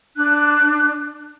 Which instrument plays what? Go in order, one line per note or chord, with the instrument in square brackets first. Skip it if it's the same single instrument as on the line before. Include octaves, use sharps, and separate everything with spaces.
[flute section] D4 F#6